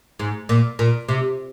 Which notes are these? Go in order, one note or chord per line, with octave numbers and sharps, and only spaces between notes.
G#2
A#2
A#2
C3